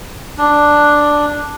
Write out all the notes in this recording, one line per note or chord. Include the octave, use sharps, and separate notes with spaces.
D4